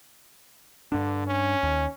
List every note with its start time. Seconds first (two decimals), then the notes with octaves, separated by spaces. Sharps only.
0.92 G2 D3 D4
1.27 C#4
1.63 D#2